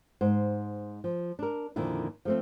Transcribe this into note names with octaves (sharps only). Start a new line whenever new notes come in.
G#2 C5
F3
D4 A#4
F2 A#2 D3 D#3 E4
F3 A3 C4